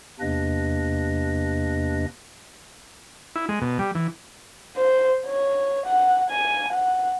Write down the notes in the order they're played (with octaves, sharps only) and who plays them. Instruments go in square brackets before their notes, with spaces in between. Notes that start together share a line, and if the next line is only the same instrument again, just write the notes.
[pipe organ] E2 C3 A#3 D4 B4 D#5
[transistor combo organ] E4
G#3
B2
G3
E3
[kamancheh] C5
C#5
F#5
G#5
F#5